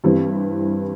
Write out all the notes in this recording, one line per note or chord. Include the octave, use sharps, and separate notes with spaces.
G2 E3 G3 C4